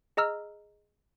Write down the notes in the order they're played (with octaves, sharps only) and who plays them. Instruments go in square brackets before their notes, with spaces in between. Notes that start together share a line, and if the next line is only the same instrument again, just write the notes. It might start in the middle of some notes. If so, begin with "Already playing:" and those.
[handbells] G#4 D#5 A#5 E6 F6